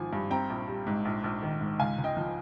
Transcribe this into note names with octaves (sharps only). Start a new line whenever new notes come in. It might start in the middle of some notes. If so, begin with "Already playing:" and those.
Already playing: G#1 F3 G#5
G2
C4 G5 A#5
A#1
G3
G#2
A#1
A#1
D#3
G#2
C#2 F5 G#5
C#2
D#5 G5
F3